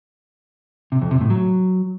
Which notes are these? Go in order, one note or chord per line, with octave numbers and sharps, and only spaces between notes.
C3
F2
C3
A2
F#3